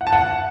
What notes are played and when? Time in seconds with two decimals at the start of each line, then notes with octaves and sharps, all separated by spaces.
0.01 F#5
0.07 A5
0.13 F#5